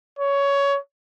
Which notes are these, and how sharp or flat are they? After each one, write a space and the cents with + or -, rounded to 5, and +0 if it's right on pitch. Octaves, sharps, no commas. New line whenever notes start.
C#5 +15